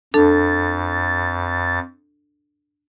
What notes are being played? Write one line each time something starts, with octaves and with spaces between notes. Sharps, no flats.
F2 D4 A4 A5 A6